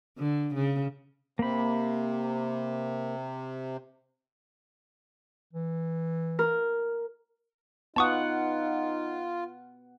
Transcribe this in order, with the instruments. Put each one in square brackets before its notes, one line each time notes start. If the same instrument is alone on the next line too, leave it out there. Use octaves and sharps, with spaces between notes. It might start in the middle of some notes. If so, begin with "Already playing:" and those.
[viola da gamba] D3
C#3
[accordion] C3 [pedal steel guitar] A#3 B5
[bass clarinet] E3
[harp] A#4
[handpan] B3 F#5 [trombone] D#4 [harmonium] F4 [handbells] A5 C#6 D#6